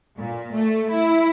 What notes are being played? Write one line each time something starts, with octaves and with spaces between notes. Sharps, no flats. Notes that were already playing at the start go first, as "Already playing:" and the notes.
A#2
A3
E4